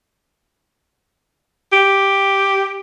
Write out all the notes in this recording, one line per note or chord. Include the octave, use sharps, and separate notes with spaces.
G4